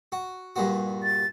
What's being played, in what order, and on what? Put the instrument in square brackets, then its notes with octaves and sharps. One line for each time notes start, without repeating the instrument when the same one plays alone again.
[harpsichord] F#4
G2 A#2 F#4
[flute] A6